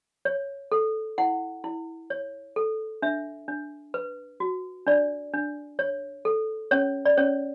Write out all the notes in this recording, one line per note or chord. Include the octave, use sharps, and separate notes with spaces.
C#5
A4
E4 F#5
E4
C#5
A4
D4 E5
D4
B4
F#4
D4 D5
D4
C#5
A4
C#4 C#5
D5
C#4 C#5